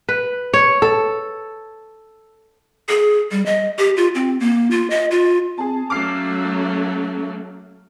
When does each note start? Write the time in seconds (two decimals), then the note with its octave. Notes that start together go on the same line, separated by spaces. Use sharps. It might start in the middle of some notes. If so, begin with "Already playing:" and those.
0.09 B4
0.54 C#5
0.82 A4
2.89 G#4
3.31 G3
3.46 D#5
3.78 G4
3.97 F4
4.15 C4
4.40 A#3
4.71 F4
4.90 D#5
5.11 F4
5.58 C4 G#4 A5
5.90 F#3 A3 A#3 C#4 D6 F6 C7